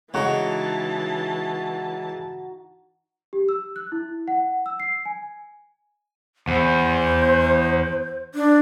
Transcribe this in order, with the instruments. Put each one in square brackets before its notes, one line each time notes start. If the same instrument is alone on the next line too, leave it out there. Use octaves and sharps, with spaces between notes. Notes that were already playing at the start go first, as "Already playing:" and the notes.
[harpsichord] C#3 G#3 [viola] E3 A5 [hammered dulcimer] D#4 F#4 F#5
[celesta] G4
E6
F#6
E4
F#5
E6
C7
G#5
[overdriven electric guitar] E2 [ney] C5
[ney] D4